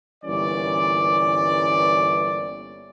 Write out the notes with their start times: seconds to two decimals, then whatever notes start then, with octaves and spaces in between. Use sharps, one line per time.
0.24 G1 E3 G3 A#3 C#4 D5